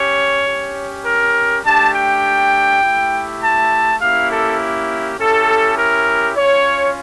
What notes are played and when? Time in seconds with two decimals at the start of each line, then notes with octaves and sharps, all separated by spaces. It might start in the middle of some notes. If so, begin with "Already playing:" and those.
Already playing: C#4 G4 C#5
0.46 C#4 G4
1.05 A#4
1.64 A3 D4 G4 A5
1.94 G5
2.83 A3 E4 G4
3.42 A5
4.00 A#3 C#4 E4 G4 F5
4.30 A4
5.19 C#4 E4 G4 A4
5.77 A#4
6.37 C#4 F4 C#5